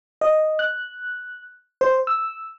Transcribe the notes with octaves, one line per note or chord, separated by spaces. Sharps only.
D#5
F#6
C5
E6